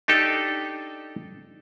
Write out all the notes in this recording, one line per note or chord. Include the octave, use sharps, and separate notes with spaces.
D4 D#4 G4 A4